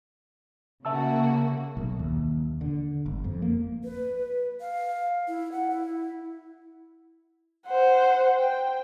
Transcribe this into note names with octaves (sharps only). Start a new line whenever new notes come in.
C#3 A#3 F#4 E5 A5 E6
B1
D#2
D3
G1
F2
A#3
B4
F5
E4
F#5
E4
C5 F#5
G5